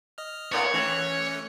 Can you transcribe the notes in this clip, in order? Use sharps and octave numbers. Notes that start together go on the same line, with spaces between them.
D#5 F6
A2 A#3 C#5 D5
E3 A3 C#4